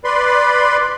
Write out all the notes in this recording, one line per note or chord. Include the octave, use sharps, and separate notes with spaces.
B4 D5 B5 C6